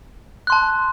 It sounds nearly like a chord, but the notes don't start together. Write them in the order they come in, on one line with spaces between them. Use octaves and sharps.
F#6 C6 A5